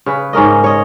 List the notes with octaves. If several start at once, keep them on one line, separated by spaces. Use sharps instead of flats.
C#3 B4
G#2 C#4 A#4 D#5
C#5 D#5